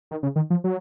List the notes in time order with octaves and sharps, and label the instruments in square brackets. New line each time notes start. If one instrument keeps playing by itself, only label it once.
[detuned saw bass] D#3
C#3
D#3
F3
F#3